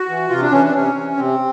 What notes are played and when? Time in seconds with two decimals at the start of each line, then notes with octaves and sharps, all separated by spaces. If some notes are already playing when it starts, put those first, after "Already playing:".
Already playing: F#4
0.09 E3
0.30 C3 F4
0.42 D4
0.51 E3 C#4
0.63 D4
0.69 C4
0.73 C3 C#4
0.95 E3
1.17 C3 C4